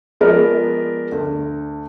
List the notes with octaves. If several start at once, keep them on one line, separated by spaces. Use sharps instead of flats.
F3 G#3 B3 A#4 D5 D#5
D2